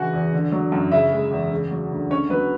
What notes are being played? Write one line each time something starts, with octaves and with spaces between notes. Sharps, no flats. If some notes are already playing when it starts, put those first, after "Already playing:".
Already playing: C#3 E3 F#4 F#5 G#5
E2
D3
F#3
F#2
C#3 E4 E5
G#3
E2
C#3
F#3
D2
D3 C#4 C#5
F#3 B3 B4